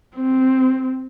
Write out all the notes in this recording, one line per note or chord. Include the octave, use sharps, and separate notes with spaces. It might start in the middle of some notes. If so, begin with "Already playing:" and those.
C4